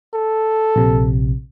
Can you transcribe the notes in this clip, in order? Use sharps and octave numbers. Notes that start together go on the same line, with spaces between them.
A4
A#1 C3